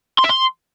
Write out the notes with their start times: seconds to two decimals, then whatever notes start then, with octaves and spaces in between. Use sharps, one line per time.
0.19 C6
0.24 E5
0.29 C6